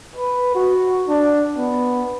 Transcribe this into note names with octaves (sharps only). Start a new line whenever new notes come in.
B4
F#4
D4
B3